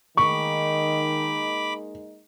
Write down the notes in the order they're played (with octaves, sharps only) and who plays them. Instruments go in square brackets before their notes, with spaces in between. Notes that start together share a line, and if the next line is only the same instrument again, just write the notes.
[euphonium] D#3 [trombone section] G#3 A#3 D#4 [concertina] B5 D6 [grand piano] C#6